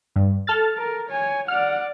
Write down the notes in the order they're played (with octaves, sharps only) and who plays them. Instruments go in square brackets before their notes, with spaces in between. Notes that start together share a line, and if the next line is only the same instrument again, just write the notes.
[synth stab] G2
A4 F6 A6
[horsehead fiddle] A#4
C#5 G#5
[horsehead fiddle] D5 F#5 [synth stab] F6